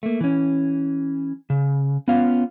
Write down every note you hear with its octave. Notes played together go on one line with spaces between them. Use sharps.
A3 A#3
E3 C#4
C#3
B3 C#4 F4 F5